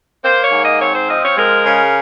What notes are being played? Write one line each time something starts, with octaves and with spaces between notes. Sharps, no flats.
A#3 C5
C#5
G#2
D#5
C4 C#5
C5
F3 D#5
C#5
G#3 A#4
C#3